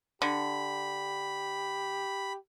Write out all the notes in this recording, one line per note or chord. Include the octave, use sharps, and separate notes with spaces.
D3 G4 B5